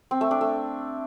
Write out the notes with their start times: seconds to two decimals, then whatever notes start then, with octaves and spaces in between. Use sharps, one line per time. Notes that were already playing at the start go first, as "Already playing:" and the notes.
0.11 C4
0.21 A3
0.31 D4
0.41 A3